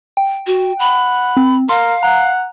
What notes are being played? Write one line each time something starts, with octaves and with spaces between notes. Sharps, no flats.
G5
F#4
F#5 B5
C4
A#4 F5 C6
F#5 A#5